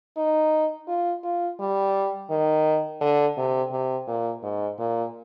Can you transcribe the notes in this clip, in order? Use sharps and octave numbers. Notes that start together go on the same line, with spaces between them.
D#4
F4
F4
G3
D#3
D3
C3
C3
A#2
G#2
A#2